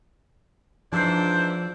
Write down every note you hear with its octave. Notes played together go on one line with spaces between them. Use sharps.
G#2 E3 F3 D4 C5 A5 E6 C7